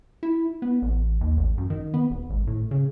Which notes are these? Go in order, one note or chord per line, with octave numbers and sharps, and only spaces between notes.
E4
B3
A1
D#2
A1
F#2
D#3
B3
D#1
G#1
A2
C#3